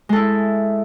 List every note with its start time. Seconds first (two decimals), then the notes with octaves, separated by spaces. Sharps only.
0.09 G#3
0.13 A4
0.16 E4